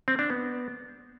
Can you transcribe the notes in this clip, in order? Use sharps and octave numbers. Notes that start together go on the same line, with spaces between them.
C4
D4
B3